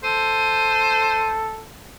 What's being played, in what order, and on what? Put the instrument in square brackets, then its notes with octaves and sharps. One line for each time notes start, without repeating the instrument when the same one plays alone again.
[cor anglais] A4 [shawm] C5 [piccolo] D#7